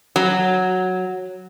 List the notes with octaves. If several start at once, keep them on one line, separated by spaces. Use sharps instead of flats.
F#3